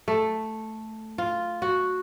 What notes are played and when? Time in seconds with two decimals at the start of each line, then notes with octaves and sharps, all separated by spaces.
0.08 A3
1.18 F4
1.62 F#4